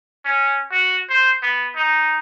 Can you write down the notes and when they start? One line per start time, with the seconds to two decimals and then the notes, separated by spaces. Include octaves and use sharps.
0.25 C#4
0.71 F#4
1.09 C5
1.42 B3
1.76 D#4